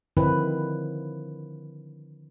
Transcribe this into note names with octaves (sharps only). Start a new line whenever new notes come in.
D3 D#3 F3 C4 E4 B4